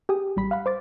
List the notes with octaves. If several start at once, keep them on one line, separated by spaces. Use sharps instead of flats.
G4 G#4 D#6
A1 G3 B5 B6
F5 F#5 B5
C5 D6 A6